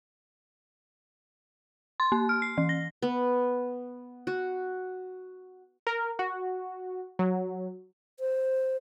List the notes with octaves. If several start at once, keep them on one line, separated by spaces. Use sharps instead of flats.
C6
A#3
F6
C7
E3
A#6
B3
F#4
A#4
F#4
F#3
C5